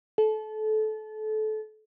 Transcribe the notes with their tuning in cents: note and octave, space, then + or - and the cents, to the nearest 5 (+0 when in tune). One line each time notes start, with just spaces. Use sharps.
A4 -25